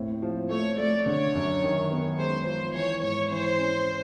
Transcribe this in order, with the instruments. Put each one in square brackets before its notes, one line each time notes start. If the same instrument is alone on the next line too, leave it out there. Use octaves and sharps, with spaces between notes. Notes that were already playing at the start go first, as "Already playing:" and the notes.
Already playing: [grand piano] D#2 A2 C4
F3
[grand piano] A3 [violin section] C#5
[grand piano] A3 [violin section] D5
[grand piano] D3 [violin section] C#5
[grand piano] F#2
D#3
B3
[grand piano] G#3 [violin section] C5
[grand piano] F3 [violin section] C5
[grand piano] E3 [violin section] C#5
[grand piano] G#2 [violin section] C#5
[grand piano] E3 [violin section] C5
[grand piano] C#4